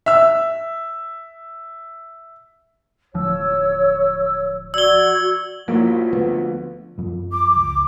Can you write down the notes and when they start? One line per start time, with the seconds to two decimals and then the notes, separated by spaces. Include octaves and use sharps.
0.06 E5 E6
3.14 D1 F3 C#5 E6
4.74 F#4 D5 E6 G#6 G7
5.68 A#1 F3 F#3 A#3 E4
6.13 D2 B3
6.98 F#2 F3
7.32 D6
7.56 C#2